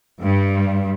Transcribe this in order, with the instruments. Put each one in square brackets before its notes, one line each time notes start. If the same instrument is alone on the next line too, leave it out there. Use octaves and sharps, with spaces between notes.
[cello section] G2